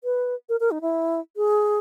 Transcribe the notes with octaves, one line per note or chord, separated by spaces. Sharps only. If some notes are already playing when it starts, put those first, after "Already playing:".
B4
A#4
A#4
D#4
E4
G#4